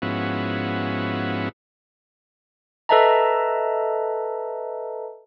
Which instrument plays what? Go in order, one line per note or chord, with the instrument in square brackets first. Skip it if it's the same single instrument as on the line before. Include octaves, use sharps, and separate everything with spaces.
[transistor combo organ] G#2 F3 B3 C#4 E4 F#4
[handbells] A4 B4 D#5 E5 A5 A#5